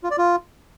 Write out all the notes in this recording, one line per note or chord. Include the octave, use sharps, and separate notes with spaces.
F4
D5
F4